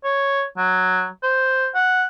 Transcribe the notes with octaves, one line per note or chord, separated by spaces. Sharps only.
C#5
F#3
C5
F#5